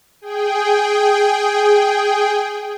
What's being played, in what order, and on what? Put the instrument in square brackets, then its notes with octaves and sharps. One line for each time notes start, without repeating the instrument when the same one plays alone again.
[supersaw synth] G#4 G5